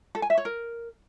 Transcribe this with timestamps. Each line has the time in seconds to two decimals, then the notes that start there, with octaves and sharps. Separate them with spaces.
0.15 A4
0.22 G#5
0.30 E5
0.37 C#5
0.45 A#4